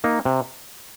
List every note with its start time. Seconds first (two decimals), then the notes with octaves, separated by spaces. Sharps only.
0.04 A#3 D#4
0.25 C3